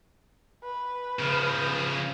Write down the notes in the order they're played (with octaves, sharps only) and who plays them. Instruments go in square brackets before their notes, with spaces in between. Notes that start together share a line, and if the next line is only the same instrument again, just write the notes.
[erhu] B4
[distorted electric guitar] C#3 F3